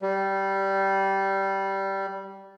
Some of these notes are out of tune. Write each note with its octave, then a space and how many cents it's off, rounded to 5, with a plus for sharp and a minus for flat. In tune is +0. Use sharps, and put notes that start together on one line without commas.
G3 -10